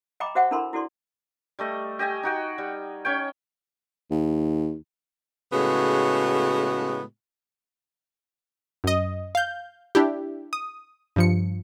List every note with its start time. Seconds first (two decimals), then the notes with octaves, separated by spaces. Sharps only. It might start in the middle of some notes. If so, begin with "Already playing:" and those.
0.20 D#5 G5 A#5 B5 D6
0.35 F#4 C5 E5 F#5 G5 C#6
0.51 D4 E4 A4 A#4 B5 C6
0.73 E4 F#4 A4 D5 C6
1.59 G3 A3 D#5
1.99 G4 D#5 G5 G#5
2.23 D#4 F#4 G5
2.58 G3
3.05 C#4 C#5 G5
4.11 D#2
5.53 A2 C#3 G#3 A3 B3 F#4
8.84 F#2 D#5
9.35 F5 G6
9.95 D4 E4 G4
10.53 D#6
11.16 G2 F3 C#7